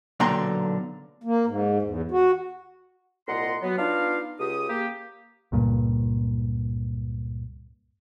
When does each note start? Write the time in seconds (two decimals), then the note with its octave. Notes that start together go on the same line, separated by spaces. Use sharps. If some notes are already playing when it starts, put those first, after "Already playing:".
0.20 B1 A#2 D3 G5 A#5 C6
1.24 A#3
1.47 G#2
1.82 E2
2.11 F#4
3.28 C2 A#2 D#5 F#5 A#5 C6
3.62 F#3 B3
3.78 B3 D4 D#4 F4 F5
4.40 C#2 G4 D#6
4.69 A#3 G4
5.52 C#2 G2 A#2